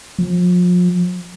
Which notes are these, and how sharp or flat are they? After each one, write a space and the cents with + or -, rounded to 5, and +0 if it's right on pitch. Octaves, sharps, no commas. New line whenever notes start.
F3 +35